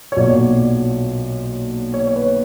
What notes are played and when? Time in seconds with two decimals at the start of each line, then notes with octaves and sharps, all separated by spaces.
0.12 C#5
0.16 B1 A#2 F#3 D5
1.94 C#5
2.07 C#5
2.16 B4